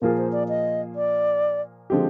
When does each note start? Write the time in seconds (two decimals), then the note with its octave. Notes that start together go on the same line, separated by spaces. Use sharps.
0.02 A#2 F3 A#3 F4 G#4 A#4
0.17 C5
0.32 D5
0.49 D#5
0.95 D5
1.90 D3 F3 G#3 C4 G4